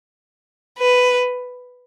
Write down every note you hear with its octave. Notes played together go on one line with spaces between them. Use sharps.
B4